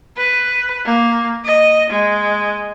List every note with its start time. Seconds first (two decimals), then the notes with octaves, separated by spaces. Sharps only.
0.17 B4
0.85 A#3
1.45 D#5
1.90 G#3